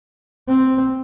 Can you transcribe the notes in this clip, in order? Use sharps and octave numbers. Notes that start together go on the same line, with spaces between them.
C4